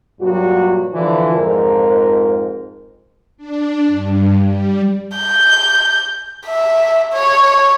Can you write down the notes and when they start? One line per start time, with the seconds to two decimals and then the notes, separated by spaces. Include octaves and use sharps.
0.21 G2 A#2 F#3 F#4
0.94 D3 E3 F3
1.34 F2 G#2 F3 A#4
3.37 D4
3.86 G2
4.41 G3
5.18 G6
6.46 E5
7.14 C#5